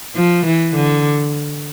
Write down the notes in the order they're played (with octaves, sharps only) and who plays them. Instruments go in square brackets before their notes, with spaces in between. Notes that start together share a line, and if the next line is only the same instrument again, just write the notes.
[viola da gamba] F3
E3
D3